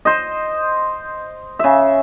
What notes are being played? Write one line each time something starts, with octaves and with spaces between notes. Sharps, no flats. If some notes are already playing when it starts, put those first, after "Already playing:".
C5 D#5
C#3 E5